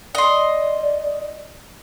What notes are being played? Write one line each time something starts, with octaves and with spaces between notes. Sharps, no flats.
D5 D#5 C6